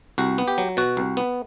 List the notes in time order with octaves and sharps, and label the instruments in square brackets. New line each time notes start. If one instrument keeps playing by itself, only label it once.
[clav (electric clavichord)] C2 F#4
B3
G4
F#3
B2 F#4
C2
B3